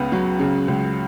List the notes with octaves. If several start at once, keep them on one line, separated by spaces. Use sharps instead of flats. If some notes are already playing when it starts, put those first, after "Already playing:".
Already playing: C#2 C#3 B3
F#3
C#3
C#2